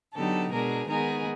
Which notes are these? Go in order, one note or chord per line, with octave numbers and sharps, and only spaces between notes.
D3 F#3 B3 D#4 G4 A4
B2 G#3 B3 D4 G#4 A#4
D#3 G#3 B3 D#4 G#4 A#4